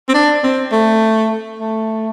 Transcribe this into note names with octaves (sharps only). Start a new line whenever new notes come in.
C4
D4
C4
A3
A3